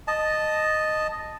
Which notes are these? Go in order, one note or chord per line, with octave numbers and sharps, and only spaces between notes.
D#5 A5